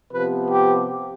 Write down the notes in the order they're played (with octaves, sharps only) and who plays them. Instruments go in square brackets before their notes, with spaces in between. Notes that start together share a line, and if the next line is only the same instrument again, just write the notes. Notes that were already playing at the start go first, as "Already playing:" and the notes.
[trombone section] C3 F3 B3 B4
G4